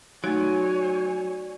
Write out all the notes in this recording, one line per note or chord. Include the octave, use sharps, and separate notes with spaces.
F#3 A3 D#4 F#4 C#5 D5 G#5